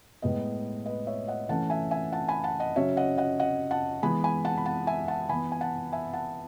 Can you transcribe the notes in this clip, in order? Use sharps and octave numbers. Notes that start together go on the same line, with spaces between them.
A2 G#3 B3 B4 D#5
B4 D#5
C#5 E5
D#5 F#5
E3 A3 C#4 F#5 A5
E5 G#5
E5 G#5
F#5 A5
G#5 B5
F#5 A5
D#5 F#5
C#3 F#3 C#4 C#5 E5
D#5 F#5
D#5 F#5
D#5 F#5
F#5 A5
E3 G#3 B3 G#5 B5
G#5 B5
F#5 A5
B5
F#5 A5
E5 G#5
F#5 A5
E3 B3 G#5 B5
G#5
F#5 A5
E5 G#5
F#5 A5